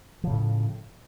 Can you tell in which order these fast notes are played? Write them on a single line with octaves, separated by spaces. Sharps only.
F3 C#3 A2